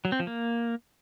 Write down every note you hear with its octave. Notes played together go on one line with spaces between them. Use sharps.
F#3
C4
F3
A#3